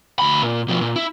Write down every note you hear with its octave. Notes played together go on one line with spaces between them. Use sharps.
D2 B5
A#2
B2 F3
A#2
E4